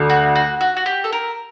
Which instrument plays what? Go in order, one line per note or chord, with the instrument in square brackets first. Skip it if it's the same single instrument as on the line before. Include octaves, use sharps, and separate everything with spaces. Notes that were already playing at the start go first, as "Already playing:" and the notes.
Already playing: [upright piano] D2 D3 A3
[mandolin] F#4
F#4
F#4
F#4
G4
A4
A#4